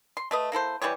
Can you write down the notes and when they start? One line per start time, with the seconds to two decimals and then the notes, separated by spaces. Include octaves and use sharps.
0.17 C6
0.31 A3 B4 D#5
0.52 A#3 E4 A4 C5
0.82 E3 G3 G4 C#5